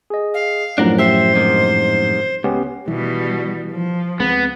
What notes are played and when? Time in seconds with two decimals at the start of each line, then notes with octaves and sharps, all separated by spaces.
0.10 G#4 D#5
0.34 F5
0.78 F#2 A2 F3 D4 F#4 A#4
0.98 G4 C5 E5
1.34 G#2 C3 D#3
2.44 C#2 B3 C#4 G4
2.88 B2 D#3 E3 G3
3.72 F3
4.20 C#2 G#3 B3 C4